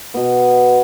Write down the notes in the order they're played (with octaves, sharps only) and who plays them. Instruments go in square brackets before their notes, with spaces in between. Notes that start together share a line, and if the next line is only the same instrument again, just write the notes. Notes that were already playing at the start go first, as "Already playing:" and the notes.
[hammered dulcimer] B2 B3